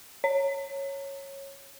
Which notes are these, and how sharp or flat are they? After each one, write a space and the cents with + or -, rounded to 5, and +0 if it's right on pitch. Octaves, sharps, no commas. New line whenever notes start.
C#5 -10